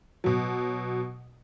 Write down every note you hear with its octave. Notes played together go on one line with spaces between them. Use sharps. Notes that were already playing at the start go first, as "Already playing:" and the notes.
B2 F#3